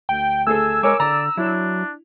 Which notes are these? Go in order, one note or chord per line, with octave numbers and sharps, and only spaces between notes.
D2 G5
A3 G#4 A4 G#5 E6
G#3 A#4 C#5 G#5 D6
D3 D5 A#5
F#3 D4 E4